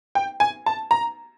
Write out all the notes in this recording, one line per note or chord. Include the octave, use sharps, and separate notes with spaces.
G5
G#5
A5
A#5